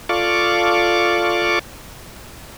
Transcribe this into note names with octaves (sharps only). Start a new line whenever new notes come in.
F4 A4 D5 F5 C#6 D6